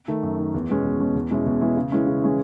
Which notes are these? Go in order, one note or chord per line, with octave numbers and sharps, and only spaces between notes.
D#3 A3
F#2
D#3 A3
E2
B2 G#3 C#4
E2
B2 G#3 C#4
E2
B2 G#3 C#4 E4
E2
B2 G#3 C#4 E4
C#3
E3 G#3 C#4 E4
C#3
E3 G#3 C#4 E4